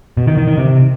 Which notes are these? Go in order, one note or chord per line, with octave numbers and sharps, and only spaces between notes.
B2
D#3
D#3
D#3
C3